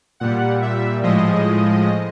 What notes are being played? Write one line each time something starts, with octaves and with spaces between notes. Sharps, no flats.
A#2 G3 F#5
E5
A2 F3 G#3 D#5